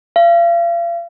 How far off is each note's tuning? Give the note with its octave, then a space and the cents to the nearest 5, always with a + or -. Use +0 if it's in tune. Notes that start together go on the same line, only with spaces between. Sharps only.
F5 -40